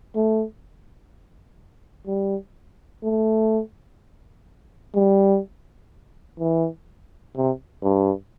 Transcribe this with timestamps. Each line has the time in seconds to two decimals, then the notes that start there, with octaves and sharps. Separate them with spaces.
0.15 A3
2.07 G3
3.03 A3
4.95 G3
6.39 E3
7.36 C3
7.83 G2